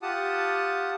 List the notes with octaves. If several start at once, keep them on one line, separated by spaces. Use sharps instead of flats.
F4 G4 F#5 A5 D#6